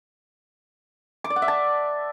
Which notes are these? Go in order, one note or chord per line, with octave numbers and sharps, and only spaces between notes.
D6
D5
F#5
E5
A5